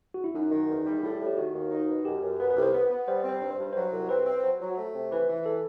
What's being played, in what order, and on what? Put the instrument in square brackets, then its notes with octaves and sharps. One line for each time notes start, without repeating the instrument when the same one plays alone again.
[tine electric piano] F#4
E4
[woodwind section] F#2 [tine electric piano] D#4
[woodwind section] D#3
E2
G3
[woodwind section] A2 [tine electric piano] E4
[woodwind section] A2
[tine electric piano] G4
[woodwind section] D#3 [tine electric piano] F#4
[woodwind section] D#2
D#4
B2
[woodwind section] F#2 [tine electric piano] G4
[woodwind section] F#2
[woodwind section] B3 [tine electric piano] B4
[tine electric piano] B4
[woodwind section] C2
[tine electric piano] C5
[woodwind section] B3 [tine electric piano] B4
[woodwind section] B3
[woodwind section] G3 [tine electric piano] C5
[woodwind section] C4
[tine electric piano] C5
[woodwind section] G2
[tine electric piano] C5
[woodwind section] G2
[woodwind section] F#3 [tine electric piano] C5
[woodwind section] C2
[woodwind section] C4 [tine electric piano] B4
[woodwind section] C4
[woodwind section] F#3 [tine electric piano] C5
[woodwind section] F#3
A3
C3
[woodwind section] E3 [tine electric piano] B4
[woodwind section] E3
[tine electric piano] A4